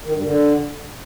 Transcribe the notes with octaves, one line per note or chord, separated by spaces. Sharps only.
D#3
G2
D3